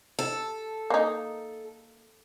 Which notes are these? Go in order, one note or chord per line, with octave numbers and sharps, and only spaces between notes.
A4
A#3 D#4